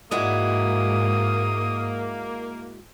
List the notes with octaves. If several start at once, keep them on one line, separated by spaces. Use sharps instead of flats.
G#2 G#3 A#3 E4 F#4 D#6